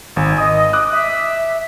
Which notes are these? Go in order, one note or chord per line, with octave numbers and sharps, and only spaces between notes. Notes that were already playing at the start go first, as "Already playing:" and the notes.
G#1 G#5
D#5 D#6
D6 D#6 F#6
E5